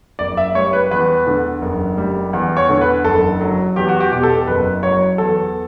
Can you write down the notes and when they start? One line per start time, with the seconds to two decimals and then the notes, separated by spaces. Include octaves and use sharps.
0.19 F#1 D5
0.37 E5
0.55 G3 C#5
0.73 B4
0.91 E2 B4
1.27 D3
1.62 F#1
1.97 G3
2.33 E2
2.57 C#5
2.69 D3
2.81 B4
3.05 F#1 A4
3.41 F#3
3.76 E2 G4
3.89 F#4
4.00 G4
4.12 B2 G4
4.23 A4
4.47 F#1 B4
4.83 F#3 C#5
5.18 E2 A4